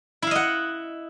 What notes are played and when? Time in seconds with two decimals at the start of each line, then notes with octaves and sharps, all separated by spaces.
0.22 E4
0.27 F5
0.31 D#5
0.35 F#5